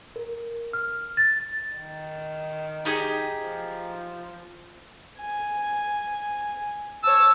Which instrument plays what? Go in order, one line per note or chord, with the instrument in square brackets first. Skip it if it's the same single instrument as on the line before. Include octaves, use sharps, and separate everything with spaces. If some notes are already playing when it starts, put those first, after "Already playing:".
[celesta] A#4
F6
A6
[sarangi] D#3
[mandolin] D#4 G4 G#4
[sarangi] F3
[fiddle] G#5
[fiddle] C#5 A5 [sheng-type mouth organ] E6